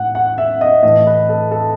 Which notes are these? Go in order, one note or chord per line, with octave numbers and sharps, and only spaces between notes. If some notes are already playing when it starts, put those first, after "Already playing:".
Already playing: A2 F#5
F#5
E5
D#5
A2 E3 A3 D#5
B4
A4
A4